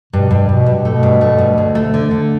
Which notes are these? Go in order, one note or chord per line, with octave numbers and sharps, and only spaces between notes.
G2 B2
G2
G2 B2
G2
B2 A3
G2
A3
G2
D2
A3
D3
D3